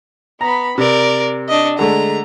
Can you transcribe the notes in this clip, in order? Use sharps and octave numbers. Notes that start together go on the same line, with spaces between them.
B3 A#5 B5
C3 A#4 D5
D4 D#5
D3 G#3 A3 A#5